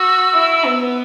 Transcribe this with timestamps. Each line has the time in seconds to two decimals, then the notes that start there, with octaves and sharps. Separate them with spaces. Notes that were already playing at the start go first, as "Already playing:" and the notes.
Already playing: F#4 E6
0.34 E4
0.66 B3